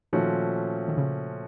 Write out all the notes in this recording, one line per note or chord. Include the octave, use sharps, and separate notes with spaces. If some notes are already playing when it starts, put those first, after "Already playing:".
A#2 D#3 F3 A3 C#4 F#4
D#3
C#3